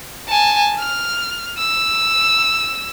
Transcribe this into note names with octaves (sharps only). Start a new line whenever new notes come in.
G#5 A5
F6
E6